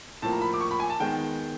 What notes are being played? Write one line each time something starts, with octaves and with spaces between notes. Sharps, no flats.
A2 F3 A#3 A5
A#5
B5
D6
C#6
B5
G#5
A5
D#3 G#3 B3 G5